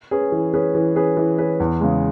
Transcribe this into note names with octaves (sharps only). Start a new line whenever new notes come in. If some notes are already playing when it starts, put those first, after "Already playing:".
C#4 G#4 B4
E3
C#4 G#4 B4
E3
C#4 G#4 B4
E3
C#4 G#4 B4
E2
C#3 G#3